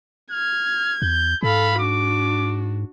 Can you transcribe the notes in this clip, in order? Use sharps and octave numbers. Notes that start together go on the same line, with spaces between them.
F6 G#6
E2 G6
G#2 A4 F5 B5
D4 F#4 D6